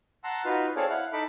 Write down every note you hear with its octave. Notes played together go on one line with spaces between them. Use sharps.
F#5 A5 A#5 C6 E6
D#4 F4 F#4 B4 F5
C4 G#4 A4 C#5 D5 F5
E4 F5 F#5
D#4 A4 B5 D6